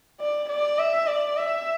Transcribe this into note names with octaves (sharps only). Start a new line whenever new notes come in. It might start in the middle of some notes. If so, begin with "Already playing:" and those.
D5
D5
E5
D5
E5